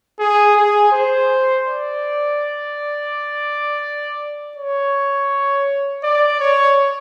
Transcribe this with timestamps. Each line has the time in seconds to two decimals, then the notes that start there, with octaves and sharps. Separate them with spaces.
0.19 G#4
0.57 G#4
0.92 C5
1.66 D5
4.57 C#5
6.03 D5
6.40 C#5